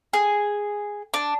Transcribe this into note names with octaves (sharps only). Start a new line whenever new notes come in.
G#4
D4